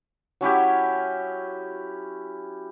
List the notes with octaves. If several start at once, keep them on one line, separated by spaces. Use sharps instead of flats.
F#3 C#4 E4 G4